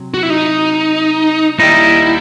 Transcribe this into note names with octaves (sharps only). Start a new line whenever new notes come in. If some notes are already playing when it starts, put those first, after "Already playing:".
Already playing: C3 F#3
F#4
E4
D#4
D#2 D#3 G3 D#4 E4